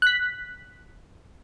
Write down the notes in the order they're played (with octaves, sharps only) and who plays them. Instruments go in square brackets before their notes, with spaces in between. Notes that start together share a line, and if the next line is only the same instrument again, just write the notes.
[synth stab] F#6 B6